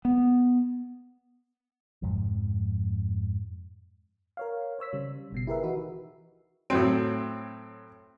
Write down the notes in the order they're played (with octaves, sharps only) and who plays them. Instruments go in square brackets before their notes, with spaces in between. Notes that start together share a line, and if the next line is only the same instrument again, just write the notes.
[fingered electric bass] B3
[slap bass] F2 G#2 C3 F3
[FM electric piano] A#4 C#5 F5
C5 C#5 E6 B6
C#3 G3
G1 B2 C7
E4 G4 G#4 A#4 B4 E5
E3 D#4 F#4 B4 E5
[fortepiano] A2 F#3 C4